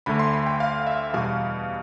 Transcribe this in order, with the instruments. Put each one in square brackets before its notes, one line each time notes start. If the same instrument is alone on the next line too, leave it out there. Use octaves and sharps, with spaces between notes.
[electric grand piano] D2 D3 A3 B5
C6
B5
G5
F5
E5
E2 B2 G3 F5